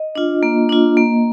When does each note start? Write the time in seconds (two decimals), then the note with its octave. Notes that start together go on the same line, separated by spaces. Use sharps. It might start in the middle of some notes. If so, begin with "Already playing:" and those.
Already playing: D#5
0.15 D4 F4
0.43 A#3
0.69 D4 F4
0.97 A#3